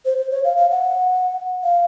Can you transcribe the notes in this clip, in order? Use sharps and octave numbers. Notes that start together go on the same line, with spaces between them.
C5
C5
C#5
F5
F5
F#5
F5